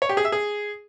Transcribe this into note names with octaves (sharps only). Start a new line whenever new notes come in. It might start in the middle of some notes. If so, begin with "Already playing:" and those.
C#5
G4
G#4
E5
G#4